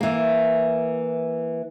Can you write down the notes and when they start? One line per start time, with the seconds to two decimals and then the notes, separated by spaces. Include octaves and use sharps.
0.01 E3 A#3